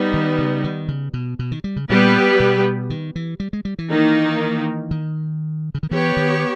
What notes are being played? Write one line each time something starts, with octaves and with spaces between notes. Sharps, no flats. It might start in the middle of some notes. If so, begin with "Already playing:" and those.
Already playing: G3 B3 D#4
D#3
C#3
D#3
C#3
B2
B2
D#3
G3
C#3
A#2 G3 B3 G4 B4
B2
D#3
E3
G3
G#3
G3
E3
D#3 A#3 D#4
D#3
C#3
D#3
E3 B3 G4 C#5
D#3